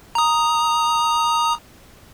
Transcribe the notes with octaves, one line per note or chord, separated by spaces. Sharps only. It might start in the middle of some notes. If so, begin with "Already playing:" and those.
A#5 D#6